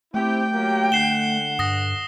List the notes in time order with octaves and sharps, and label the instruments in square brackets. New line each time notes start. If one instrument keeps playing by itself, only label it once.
[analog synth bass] A3 [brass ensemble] C4 E4 G4 [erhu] G5
[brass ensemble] F#3 A#3 G4
[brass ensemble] D3 F#5 [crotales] C7 E7 G7
[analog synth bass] G2 [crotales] D#6 A#6